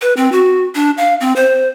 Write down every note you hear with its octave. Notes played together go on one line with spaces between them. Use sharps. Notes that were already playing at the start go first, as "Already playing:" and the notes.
B4
C4
F#4
D4
F5
C4
C5